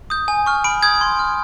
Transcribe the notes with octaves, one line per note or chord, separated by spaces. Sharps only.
D#6 G6
G#5
C#6 F6
B5 D7
D#6 G6 G#6
C6
F6